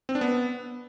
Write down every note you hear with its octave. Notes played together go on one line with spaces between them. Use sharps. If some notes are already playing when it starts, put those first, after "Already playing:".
C4
D4
B3